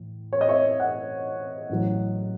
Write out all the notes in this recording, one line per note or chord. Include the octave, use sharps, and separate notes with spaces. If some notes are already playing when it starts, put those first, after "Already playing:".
Already playing: A2 E3
C#5
D#5
C#5 E5
D#5 F#5
A1 A2 F#3